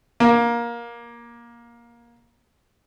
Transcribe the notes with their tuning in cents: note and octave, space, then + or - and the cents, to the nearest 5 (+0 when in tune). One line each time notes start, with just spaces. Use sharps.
A#3 +15